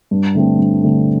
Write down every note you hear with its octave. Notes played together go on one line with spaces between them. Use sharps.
G2
D3 A3 C4
G2
D3 A3 C4